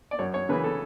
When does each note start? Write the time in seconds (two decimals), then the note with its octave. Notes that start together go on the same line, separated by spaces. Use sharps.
0.11 D5
0.19 F#2 C#5
0.34 C#5
0.49 C#3 E3 B4
0.64 A4